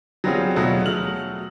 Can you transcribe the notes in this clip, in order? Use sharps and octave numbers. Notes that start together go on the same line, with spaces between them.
F#3 G3 B3 C4 F4 G#4
B2 F#3 G3 A3 F4 A4
F#3 A3 G#4 F6 F#7